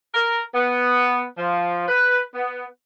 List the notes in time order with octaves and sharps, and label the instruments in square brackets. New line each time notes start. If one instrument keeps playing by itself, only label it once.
[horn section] A#4
B3
F3
B4
B3